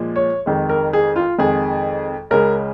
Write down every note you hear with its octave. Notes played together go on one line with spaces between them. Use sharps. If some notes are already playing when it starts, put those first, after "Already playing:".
Already playing: A#2 F3 G#3
C#5
F2 D#3 G#3
A#4
G#4
F4
F2 D#3 G#3 G#4
C#2 C#3 G#3 A#4